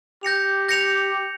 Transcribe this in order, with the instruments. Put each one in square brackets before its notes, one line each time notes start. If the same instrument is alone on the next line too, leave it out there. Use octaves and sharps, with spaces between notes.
[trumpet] G4 [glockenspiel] G6 A#6 C#7 F7
[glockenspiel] G6 A#6 C#7 F7